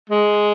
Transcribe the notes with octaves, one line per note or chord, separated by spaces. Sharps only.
G#3